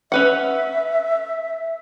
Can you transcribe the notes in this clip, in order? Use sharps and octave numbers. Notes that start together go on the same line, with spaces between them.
C#4 B4 E5 F#5